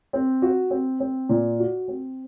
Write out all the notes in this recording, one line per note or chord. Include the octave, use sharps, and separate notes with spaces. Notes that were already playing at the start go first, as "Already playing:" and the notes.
C4
F#4
C4
C4
A#2
F#4
C4